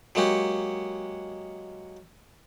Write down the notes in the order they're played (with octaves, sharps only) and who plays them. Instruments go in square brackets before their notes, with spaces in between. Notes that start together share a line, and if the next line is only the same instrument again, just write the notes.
[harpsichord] F#3 G#3 A#3 F#4 G4